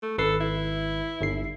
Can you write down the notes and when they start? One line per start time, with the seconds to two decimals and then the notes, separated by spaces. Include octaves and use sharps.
0.03 A3
0.18 G#1 A4 B4 C7
0.41 E4
1.21 G1 C7